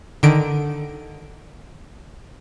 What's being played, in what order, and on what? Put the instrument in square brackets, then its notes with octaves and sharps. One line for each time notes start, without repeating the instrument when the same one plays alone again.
[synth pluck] D3 D#3 D7